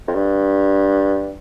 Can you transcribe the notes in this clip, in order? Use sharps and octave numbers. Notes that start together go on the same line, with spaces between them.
F2
G2